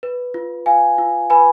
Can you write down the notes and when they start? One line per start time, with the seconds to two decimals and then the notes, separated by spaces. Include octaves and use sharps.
0.03 B4
0.34 F4
0.66 F4 F5 G#5
0.98 F4
1.30 B4 G#5 B5